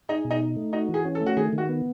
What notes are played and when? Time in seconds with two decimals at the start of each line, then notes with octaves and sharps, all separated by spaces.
0.09 D#4 G#4
0.25 B2
0.31 D#4
0.41 D#4
0.56 A3
0.73 D#4 F#4
0.88 E3
0.94 G#4
1.05 C#4
1.15 A4
1.21 A3
1.26 F#4
1.37 D#3 G#4
1.53 D#3 F#4
1.69 B3